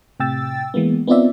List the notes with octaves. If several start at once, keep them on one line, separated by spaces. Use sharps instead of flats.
A2 C3 G5 E6 A6
E3 G#3 A#3 B3
B3 C4 D#4 F4 D5 E5